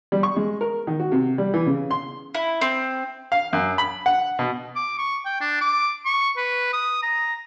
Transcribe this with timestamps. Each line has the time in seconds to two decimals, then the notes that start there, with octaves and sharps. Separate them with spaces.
0.12 G3
0.23 C#6
0.36 G#3
0.61 A#4
0.87 D#3
1.00 F#4
1.12 C3
1.38 G3
1.54 E3
1.66 C#3
1.91 C6
2.35 E4
2.61 C4
3.32 F5
3.53 F#2
3.78 B5
4.06 F#5
4.39 B2
4.76 D6
4.98 C#6
5.25 G5
5.41 D4
5.61 D6
6.05 C#6
6.37 B4
6.73 D#6
7.03 A#5